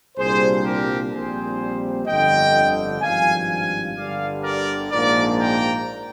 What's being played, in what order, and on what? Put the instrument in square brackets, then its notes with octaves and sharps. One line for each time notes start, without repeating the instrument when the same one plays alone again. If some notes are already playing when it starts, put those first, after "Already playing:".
[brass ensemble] C2 A#2 G3 D4 G#4 C5
G4 A#4
A#1 A#2 G3 C4 G#4 C5
G1 F2 D3 D#5 G5
G#1 G2 F3 F5 G#5
F5 G#5
G1 G2 D3 G3 D5 F5
A#4 D5
A#1 G#2 F3 A#3 D4 A#4 D5
G5 A#5